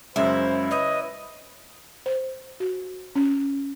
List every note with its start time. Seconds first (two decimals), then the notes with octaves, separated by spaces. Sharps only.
0.16 F#2 C#3 G#3 E4 C5
0.71 B4 C#5 D#5
2.06 C5
2.60 F#4
3.15 C#4